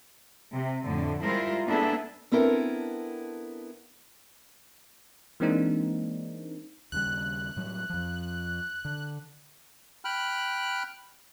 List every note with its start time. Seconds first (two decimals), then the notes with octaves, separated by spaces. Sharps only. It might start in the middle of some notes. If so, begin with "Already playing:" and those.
0.53 C3
0.84 F2 A2 D3
1.24 G3 G#3 E4 F4 A#4 C5
1.67 A#3 B3 D4 E4 G#4 A4
2.32 B3 C4 D4 E4 A4 A#4
5.40 E3 G#3 A#3 C4 D4 D#4
6.92 D#2 C#3 G3 F#6
7.56 A2 F#3 G3
7.90 F2 F3
8.85 D3
10.05 G5 B5 F6 F#6